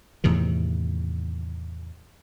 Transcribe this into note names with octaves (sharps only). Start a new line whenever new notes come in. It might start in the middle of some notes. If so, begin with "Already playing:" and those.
E2 A2 C3 D#3